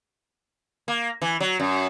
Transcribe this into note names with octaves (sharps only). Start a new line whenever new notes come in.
A#3
E3
F#3
F#2